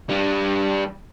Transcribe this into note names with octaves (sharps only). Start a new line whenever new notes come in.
G3 D4